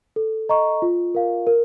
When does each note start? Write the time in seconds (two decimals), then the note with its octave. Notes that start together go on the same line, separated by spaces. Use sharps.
0.16 A4
0.49 D#5 A#5 C#6
0.82 F4
1.15 A#4 F5
1.47 A#4